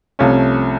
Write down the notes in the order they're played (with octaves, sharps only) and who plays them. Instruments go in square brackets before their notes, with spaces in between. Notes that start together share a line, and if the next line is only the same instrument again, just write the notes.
[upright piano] C2 C3 F3 A3 C#4